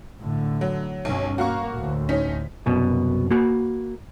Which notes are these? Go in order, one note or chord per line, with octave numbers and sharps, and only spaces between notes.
A2 D3
F#3
B1 G2 B2 C#4
A#3 F#4 F5 C#6
D2 A2
C#4 D#4 B6
C2 F#2 B2
A#3 F#4 B5